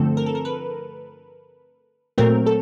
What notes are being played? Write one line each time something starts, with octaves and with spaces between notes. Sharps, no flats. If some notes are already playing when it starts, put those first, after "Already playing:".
Already playing: G2 D3 F3 A3 C4 A4
A#4
A4
A#4
B4
A#2 F#3 A3 C4 A#4
A4